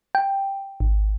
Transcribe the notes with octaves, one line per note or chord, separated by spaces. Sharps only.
G5
G#1